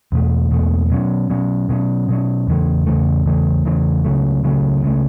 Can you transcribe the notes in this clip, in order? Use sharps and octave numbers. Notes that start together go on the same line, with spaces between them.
E2 B2 A3
E2 B2 A3
B2 F#3 C#4
B2 F#3 C#4
B2 F#3 C#4
B2 F#3 C#4
E2 C#3 E3 A3
E2 C#3 E3 A3
E2 C#3 E3 A3
E2 C#3 E3 A3
C#2 C#3 F#3 A3
C#2 C#3 F#3 A3
C#2 C#3 F#3 A3